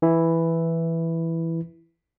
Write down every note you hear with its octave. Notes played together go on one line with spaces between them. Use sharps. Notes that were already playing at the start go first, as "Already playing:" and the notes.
E3 E4